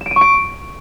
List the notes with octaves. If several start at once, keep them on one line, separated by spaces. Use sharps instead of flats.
E7
D7
D#7
C#6
D7